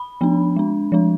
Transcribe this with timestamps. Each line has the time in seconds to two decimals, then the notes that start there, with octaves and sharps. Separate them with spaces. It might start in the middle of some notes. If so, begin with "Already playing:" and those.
Already playing: B5
0.21 F3 B3 D4
0.56 G#3 D4
0.92 F3 G#3 D4